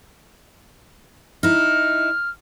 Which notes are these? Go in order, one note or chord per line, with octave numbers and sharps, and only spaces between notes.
D#4 E4 F6